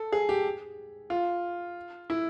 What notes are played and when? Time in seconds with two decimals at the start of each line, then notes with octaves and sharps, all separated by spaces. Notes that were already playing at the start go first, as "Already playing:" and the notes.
Already playing: A4
0.12 G#4
0.29 G4
1.10 F4
2.10 E4